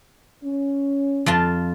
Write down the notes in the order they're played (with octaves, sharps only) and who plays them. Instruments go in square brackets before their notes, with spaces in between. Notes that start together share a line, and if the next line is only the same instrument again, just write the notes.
[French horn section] C#4
[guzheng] F2 F4 A5